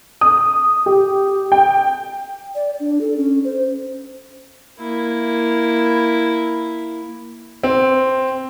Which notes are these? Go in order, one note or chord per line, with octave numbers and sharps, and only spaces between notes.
D#6
G4
G5
D5
D4
A4
C#4
C5
A#3 E4
C4